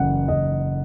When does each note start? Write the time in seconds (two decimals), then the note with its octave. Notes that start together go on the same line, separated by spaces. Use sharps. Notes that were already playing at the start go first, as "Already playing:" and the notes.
Already playing: F#1 E3 F#5
0.28 F#1 D#5